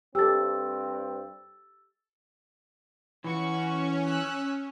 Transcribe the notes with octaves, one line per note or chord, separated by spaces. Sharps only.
G2 C4 G4 A4 E6 A6
E3 C#4 F#4 C#6
E6 F#6